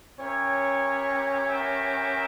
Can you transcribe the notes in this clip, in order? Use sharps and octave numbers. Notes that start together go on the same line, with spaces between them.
C#4 E4 G4 A#4 C#5
B3 G4 A#4 E5 G5